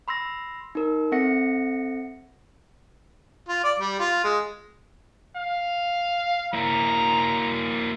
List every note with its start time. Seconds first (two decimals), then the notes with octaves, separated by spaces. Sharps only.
0.08 B5 C6 E6 A#6
0.75 D#4 A#4
1.12 C4 A4 E5 F#5 A#6 C#7
3.49 F4
3.64 D5
3.80 G3
4.00 F4
4.24 G#3
5.37 F5
6.54 A#3 E4 A#5